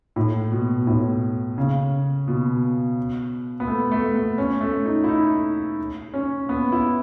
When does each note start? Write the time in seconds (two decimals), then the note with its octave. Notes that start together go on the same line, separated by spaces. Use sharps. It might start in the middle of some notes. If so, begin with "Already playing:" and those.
0.16 A2
0.52 B2
0.87 A2
1.58 C#3
2.28 B2
3.60 B3
3.67 A3
3.92 A3
4.15 B3
4.38 C#4
4.61 A3
4.85 D#4
5.04 E4
5.09 D#4
6.14 C#4
6.49 B3
6.72 E4